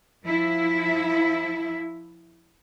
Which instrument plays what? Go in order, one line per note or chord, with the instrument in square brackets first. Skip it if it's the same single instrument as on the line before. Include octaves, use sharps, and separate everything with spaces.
[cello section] F3 E4